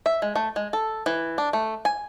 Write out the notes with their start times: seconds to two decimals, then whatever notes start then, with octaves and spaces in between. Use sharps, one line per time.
0.06 E5
0.22 G#3
0.36 A3
0.56 G#3
0.73 A4
1.06 E3
1.38 D4
1.53 A3
1.85 G#5